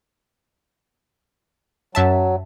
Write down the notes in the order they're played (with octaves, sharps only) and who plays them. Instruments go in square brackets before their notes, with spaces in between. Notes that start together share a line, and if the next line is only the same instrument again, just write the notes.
[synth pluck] F#2 E5 A5 [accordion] F#3